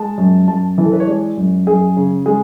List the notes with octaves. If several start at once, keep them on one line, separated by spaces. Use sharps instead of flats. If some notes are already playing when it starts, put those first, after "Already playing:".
Already playing: G#3 A5
F#2
F#2 A5
E3
A4
B4
C#5
G#3 D5
F#2
F#2 G#4
C#3
G#3 G#4